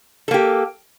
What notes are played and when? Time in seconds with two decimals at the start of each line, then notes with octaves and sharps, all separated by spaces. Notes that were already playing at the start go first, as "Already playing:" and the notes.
0.28 A4
0.31 A#3
0.34 G4